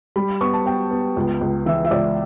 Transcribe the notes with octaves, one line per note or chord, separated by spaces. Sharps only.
G3 B5
B3 C#6
A5
B3 G5
B3
C#2
C#2
E3 E5
E5
C#2 D5